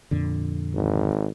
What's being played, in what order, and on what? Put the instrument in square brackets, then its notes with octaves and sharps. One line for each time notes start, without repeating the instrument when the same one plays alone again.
[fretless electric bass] F2 A#2 D3
[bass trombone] G#1